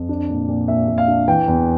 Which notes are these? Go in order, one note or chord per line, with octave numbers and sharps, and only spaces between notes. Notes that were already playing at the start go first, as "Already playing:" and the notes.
Already playing: F2
D4
A#2
A#2
A#2 E5
A#2
F5
D4
E3 G5
E2